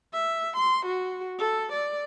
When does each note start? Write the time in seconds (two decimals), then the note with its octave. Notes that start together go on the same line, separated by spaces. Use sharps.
0.13 E5
0.57 C6
0.86 F#4
1.39 A4
1.72 D5